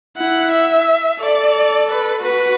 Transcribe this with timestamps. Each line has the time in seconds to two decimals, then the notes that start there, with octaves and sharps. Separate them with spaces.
0.17 E4 F#5
0.52 E5
1.19 A4 D5
1.89 B4
2.23 F#4 B4